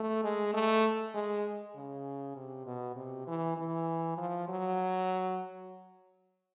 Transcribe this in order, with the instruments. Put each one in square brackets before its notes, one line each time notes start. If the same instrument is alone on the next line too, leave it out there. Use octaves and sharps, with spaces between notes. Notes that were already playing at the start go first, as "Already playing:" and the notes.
Already playing: [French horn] A3
G#3
A3
G#3
C#3
C3
B2
C3
E3
E3
F3
F#3